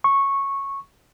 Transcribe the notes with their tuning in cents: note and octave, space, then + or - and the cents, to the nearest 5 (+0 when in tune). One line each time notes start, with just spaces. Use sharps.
C#6 -10